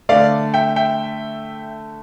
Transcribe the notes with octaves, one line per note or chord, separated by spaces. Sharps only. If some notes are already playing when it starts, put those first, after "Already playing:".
D3 A3 D5 F5
E5 G5
E5 G5